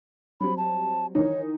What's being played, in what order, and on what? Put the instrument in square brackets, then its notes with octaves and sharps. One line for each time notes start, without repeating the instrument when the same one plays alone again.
[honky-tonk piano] F#3 G3 C4 [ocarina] B5
[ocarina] A5
[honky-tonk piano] D#3 E3 D#4 [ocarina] C#5